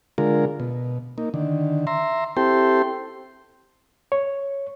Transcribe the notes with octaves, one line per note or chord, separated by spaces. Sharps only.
D3 G#3 F4 A#4
B2
A#3 D#4
D3 D#3
E5 A#5 C6
C4 E4 G4 A4 G5 C6
C#5